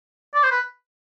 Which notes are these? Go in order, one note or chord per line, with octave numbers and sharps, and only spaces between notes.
D5
C5
B4